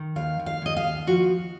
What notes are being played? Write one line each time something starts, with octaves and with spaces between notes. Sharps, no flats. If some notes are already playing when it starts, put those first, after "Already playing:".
Already playing: D#3
D#2 F5
D#2
F5
D#2 D#5
F5
D#2
F3 F#4